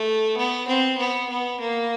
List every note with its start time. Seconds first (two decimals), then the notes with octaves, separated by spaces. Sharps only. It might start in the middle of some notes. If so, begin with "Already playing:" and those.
Already playing: A3
0.37 B3
0.68 C4
0.98 B3
1.30 B3
1.60 A#3